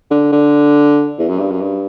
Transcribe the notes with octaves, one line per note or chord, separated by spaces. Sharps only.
D3
D3
E2
F#2
G2
F#2
G2